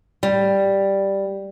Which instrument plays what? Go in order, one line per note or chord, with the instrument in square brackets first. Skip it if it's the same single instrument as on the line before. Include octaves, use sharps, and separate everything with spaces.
[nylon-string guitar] G3